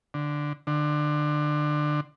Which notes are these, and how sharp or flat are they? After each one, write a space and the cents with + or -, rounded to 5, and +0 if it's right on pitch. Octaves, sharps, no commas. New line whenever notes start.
D3 +5
D3 +25